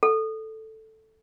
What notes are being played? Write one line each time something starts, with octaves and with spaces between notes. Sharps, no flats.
A4